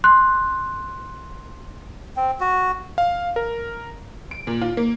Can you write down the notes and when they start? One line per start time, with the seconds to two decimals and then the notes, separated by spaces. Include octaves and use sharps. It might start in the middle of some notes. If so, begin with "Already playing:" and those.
0.04 C6 F#6
2.17 C4
2.40 F#4
2.98 F5
3.36 A#4
4.31 D7
4.47 A#2
4.62 F4
4.77 A#3